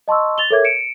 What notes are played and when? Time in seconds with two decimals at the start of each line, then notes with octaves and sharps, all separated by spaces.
0.08 D#5 A5 C6 C#6 E6
0.38 A6 F7 G7
0.50 A4 A#4 C#5 E5 D6 G#6
0.65 C#7 D7 E7